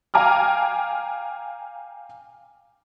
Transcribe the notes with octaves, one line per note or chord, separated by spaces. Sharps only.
F5 G5 G#5 A#5 D6 F6